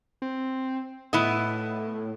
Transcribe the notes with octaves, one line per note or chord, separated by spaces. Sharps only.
C4
A2 B3 E4 D#5